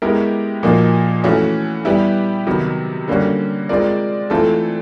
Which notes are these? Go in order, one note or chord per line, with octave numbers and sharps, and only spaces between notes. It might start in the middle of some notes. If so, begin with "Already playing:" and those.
G#3 B3 E4 G4 A#4
A#2 F3 A#3 D#4 F#4
E3 A3 C#4 F#4
G3 B3 E4 G4 B4
C3 D#3 F#3 B3
D3 G3 A#3 C#4 F#4
G#3 C4 F4 A#4 D5
E3 A3 C4 F4 A4